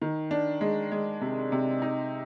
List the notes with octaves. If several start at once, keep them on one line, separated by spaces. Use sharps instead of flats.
D#3
D4
G#3
G#3
C3
C3
D#4